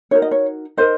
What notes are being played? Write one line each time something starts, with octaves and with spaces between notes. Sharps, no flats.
D#4 F#4 A#4 C#5
D#5
C#5
D#4 A#4 C5 D#5